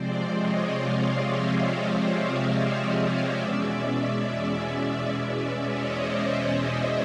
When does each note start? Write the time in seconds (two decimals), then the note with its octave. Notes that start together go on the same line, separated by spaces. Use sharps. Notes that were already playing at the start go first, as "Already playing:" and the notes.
Already playing: C3 F3 G#3 C4 C5 D5
0.33 C#5 D#5
0.76 D#5 F5
1.19 D5 E5
3.35 E2 B2 G#3 C#4 D5 E5
5.09 D5 E5
5.38 D5 E5
5.67 C#5 D#5
5.96 C5 D5
6.24 C5 D5
6.53 C5 D5